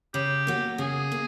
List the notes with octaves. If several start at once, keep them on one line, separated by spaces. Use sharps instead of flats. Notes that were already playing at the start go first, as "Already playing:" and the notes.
C#3 G4
F#3 A#3
C#3 G#4
A#3